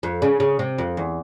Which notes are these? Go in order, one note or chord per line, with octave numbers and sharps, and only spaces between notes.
F2
C#3
C#3
C3
F2
E2